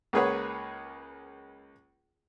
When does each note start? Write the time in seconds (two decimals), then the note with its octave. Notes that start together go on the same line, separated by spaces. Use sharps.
0.13 C#2 A#3 G#4 B4 C#5 F#5